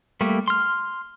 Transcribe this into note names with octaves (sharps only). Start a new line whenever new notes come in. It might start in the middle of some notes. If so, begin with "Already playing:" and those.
G3 A3 A#3
C6 F6